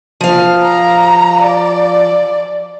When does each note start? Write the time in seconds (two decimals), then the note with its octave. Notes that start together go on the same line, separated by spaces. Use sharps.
0.21 F3 F5
0.63 A#5
1.42 D5